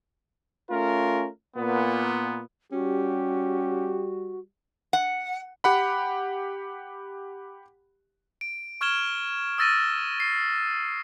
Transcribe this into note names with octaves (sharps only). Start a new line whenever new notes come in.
A3 C#4 F4 A#4
A#2 B3
G3 C#4 F#4 G4
F#5
G4 F#5 B5
D7
C#6 F6 G#6 E7 G7
D#6 E6 A6 A#6 D#7
C7